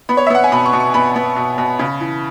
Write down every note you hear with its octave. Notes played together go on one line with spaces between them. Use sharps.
B3 B5
C#5
E5
B3 F#5
G#5
B2 B5
C#6
B2
C#6
B3 B5
B3
B2
B2
C#3
E3